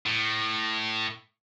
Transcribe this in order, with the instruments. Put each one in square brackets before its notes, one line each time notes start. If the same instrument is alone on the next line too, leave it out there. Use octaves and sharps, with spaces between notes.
[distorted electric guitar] A2